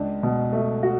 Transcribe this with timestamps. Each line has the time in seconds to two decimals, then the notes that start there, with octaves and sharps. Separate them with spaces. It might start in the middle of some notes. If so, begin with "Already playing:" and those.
Already playing: C#2 D4
0.23 B2
0.53 A3
0.83 F#4